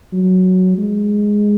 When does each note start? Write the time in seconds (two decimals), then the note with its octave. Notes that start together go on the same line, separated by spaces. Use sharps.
0.12 F#3
0.78 G#3